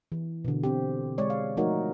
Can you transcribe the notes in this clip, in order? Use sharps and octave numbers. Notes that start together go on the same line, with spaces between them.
E3
B2 D3
C4 G4
G#3 C#5 D5
F5
F3 A3 D#4 F#4 A#4 C#5